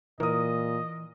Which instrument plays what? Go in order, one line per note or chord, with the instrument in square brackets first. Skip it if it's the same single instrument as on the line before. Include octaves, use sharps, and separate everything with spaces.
[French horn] A#2 [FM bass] E3 [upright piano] A#4 D#6 [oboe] D#5